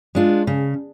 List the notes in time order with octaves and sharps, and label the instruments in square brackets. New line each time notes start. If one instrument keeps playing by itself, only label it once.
[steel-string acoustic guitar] G#3 D4 F4
C#3